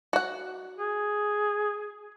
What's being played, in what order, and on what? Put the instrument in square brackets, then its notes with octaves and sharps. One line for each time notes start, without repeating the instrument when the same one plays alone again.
[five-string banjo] F#4 F#5
[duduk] G#4